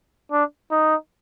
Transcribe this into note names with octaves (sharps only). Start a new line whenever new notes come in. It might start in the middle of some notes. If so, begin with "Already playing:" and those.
D4
D#4